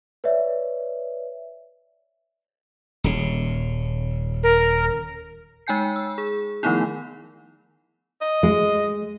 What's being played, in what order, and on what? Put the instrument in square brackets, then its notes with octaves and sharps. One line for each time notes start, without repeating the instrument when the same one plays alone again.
[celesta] B4 C#5 D5 E5
[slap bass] D#1 C#3
[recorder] A#4
[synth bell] G#3 D#4 G5 G#5 G6 C7
E6
G#4
D#3 F3 A3 B3 D#4 E4
[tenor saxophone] D#5
[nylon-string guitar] G#3